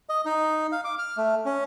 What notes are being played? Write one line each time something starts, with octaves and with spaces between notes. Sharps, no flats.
D#5
D#4
F5
D6
F6
A3
C#4